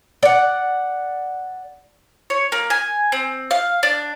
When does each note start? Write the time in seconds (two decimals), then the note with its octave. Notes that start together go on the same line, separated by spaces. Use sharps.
0.23 D5 F#5
2.30 C#5
2.52 A#3
2.70 G#5
3.12 C4
3.51 F5
3.83 D4